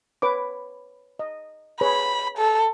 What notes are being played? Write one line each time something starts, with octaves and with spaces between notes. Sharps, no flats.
B4 C#5 D6
D#5
G#4 B4 C#5 B5
A4